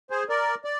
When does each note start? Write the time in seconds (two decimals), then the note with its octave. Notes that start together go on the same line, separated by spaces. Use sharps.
0.10 G#4 C5
0.29 A#4 D5
0.65 D5